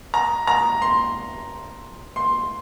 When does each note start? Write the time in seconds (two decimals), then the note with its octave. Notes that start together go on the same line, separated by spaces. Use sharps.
0.14 A#5
0.47 A#5
0.82 C6
2.16 C6